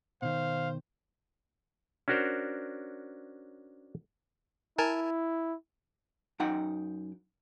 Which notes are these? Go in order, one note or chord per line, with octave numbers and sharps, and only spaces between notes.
B2 D#3 C5 F5
C#4 D4 F#4 A#4 C5 D5
E4 A#4 G#5 A5
F#2 D#4 F#5 G5